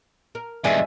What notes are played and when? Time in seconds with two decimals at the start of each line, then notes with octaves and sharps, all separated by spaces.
0.35 A#4
0.64 E2 G2 F3 G#3 D5 E5 G#5